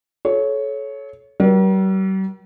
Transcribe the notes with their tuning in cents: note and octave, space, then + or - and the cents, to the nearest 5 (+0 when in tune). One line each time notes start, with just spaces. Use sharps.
A4 -35 C#5 +0
G3 -45 A#4 +45